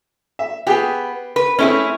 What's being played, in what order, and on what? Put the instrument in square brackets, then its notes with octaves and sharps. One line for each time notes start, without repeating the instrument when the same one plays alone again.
[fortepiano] E5
[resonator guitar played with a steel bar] B3 [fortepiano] G4 G#4 G5
[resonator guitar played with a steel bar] B4
[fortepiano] A3 C4 [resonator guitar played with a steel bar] C#4 E4 G#4